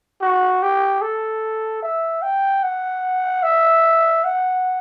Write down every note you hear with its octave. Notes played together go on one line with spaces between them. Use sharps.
F#4
G4
A4
E5
G5
F#5
E5
F#5